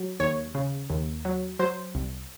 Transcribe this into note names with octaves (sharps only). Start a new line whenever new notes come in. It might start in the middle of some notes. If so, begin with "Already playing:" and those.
Already playing: F#3
D#2 C#5
C#3
D#2
F#3
F#3 C5
C2